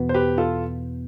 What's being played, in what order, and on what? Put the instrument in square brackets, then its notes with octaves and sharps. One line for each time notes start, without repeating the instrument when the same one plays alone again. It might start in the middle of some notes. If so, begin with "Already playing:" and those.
Already playing: [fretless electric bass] E2 B2 B3
[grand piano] C5
G4 B4
F4 A4